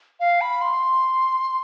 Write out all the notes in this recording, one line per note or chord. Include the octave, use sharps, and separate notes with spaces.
F5
B5
C6